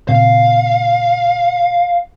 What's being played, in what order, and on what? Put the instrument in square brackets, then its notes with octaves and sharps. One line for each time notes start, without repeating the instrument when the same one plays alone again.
[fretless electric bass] A#2 C#3 C4 [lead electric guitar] F5